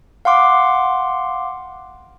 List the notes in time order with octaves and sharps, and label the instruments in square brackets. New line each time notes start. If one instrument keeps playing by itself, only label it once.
[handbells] F5 F#5 C6 D6